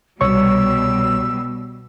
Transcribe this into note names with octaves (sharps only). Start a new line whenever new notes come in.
C2 B2 G3 C#5 C#6 E6